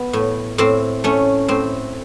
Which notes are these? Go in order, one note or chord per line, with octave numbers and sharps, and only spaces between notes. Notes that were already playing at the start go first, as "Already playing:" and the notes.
Already playing: B3
A2
A2 C4
A3 C#4
A2 C4